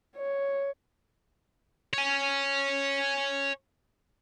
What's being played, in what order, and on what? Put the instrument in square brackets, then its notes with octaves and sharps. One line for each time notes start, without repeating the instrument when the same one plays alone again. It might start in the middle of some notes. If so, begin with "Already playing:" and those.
[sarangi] C#5
[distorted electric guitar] C#5 G#5